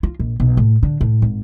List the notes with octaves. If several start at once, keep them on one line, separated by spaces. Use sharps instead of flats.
F4
A#1
B1
A2
D3
A2
G#1